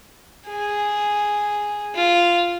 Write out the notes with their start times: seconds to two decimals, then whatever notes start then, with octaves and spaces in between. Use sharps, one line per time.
0.48 G#4
1.95 F4